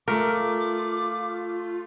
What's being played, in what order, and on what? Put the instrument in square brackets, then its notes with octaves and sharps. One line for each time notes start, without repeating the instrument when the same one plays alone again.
[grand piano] A3 [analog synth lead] F4 [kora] A#4 [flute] D6